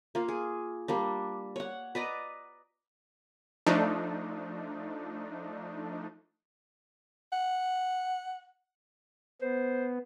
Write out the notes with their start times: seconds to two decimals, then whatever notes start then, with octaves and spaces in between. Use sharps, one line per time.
0.15 A#3 F4
0.28 G#4
0.88 G3 A#3 D4
1.56 C#5 F#5
1.95 B4 D5 D#5 A#5
3.66 F3 A3 D4 D#4
7.32 F#5
9.42 B3 C5